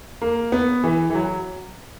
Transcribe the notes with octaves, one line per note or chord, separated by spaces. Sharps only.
A#3
B3
E3
E3
F#3